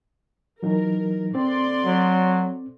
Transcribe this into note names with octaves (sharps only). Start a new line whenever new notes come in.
E3 F#3 D#4 A#4
D3 C4 D5 C6
F#3